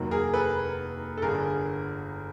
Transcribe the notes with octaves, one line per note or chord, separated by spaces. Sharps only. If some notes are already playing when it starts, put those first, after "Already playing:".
Already playing: F1 D#2 D#3 F#3
G#4 A#4
A4 B4
A4
G1 G2 D3 G#4 A#4